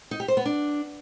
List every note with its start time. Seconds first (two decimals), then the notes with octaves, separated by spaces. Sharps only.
0.11 D#4
0.20 G4
0.28 C5
0.37 B3
0.45 D4